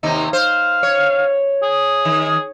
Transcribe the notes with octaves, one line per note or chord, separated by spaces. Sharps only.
D#2 C3 D#4
C5 F5
C#5
G#4
D#3